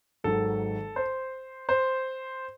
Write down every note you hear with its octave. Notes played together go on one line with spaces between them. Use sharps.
G#1 G#2 D#3 F#3 A4
C5
C5